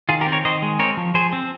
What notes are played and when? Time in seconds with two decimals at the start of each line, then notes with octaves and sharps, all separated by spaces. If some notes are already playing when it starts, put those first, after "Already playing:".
0.09 D#3 F4 G#4
0.21 G4 A#4
0.26 C4
0.32 A#4 C#5
0.45 D#3 C5 D#5
0.62 G#3
0.79 C4 A#4 C#5
0.97 F3
1.14 F3 G#4 C5
1.33 C4